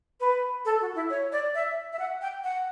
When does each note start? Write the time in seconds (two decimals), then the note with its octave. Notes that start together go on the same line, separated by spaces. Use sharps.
0.20 B4
0.65 A4
0.81 F#4
0.95 E4
1.10 C#5
1.32 D5
1.55 E5
1.93 E5
1.99 F#5
2.22 G5
2.44 F#5